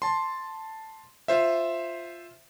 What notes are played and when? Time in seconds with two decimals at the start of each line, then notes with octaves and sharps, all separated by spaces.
0.02 A5 C6
1.28 F4 C5 E5